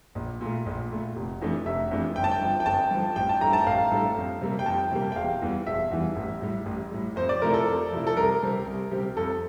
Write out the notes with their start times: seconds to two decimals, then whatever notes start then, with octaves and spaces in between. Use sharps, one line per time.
0.15 A#1
0.41 A#2 A3
0.66 A#1
0.91 A#2 A3
1.16 F1
1.42 F2 E3 A3 D4
1.65 F1 E5
1.91 F2 E3 A3 D4
2.16 G1 G5
2.24 A5
2.31 G5
2.41 G2 F3
2.60 G5
2.66 G1 A5
2.91 G2 F3
3.16 A1 G5
3.29 A5
3.41 A2 G3 D4 A4 A#5
3.53 A5
3.67 A1 F5
3.91 A2 G3 D4 A4
4.17 F2
4.41 C3 G3 A#3
4.59 G5
4.66 F2 A5
4.91 C3 G3 A#3
5.12 G5
5.16 E1 F5
5.41 E2 E3 G3
5.67 E1 E5
5.91 E2 E3 G3
6.16 A1
6.41 A2 G3
6.66 A1
6.91 A2 G3
7.16 F2 C5
7.29 D5
7.42 C3 F3 A3 E4 A#4
7.54 A4
7.67 F2
7.92 C3 F3 A3 E4
8.07 A4
8.16 C2 A#4
8.42 C3 G3 C4 G4
8.67 C2
8.91 C3 G3 C4 G4
9.17 F2 A4